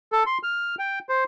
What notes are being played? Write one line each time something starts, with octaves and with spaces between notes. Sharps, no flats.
A4
C6
F6
G5
C5